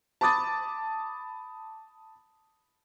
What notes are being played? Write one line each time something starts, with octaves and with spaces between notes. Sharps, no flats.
A5 B5 D6 D#6 A6